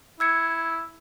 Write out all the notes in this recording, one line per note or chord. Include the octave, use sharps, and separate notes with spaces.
E4 E6 G#6 C#7